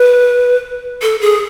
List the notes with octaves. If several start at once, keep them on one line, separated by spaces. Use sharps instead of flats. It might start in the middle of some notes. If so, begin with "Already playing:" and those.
Already playing: B4
A4
G#4